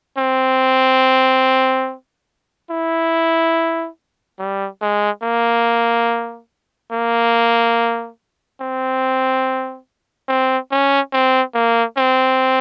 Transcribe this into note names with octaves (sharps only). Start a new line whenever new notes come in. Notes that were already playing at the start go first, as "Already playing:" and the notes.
C4
E4
G3
G#3
A#3
A#3
C4
C4
C#4
C4
A#3
C4